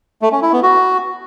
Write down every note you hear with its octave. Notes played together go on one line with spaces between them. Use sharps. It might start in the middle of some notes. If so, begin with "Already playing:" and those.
A3
C#4
E4
B3
F#4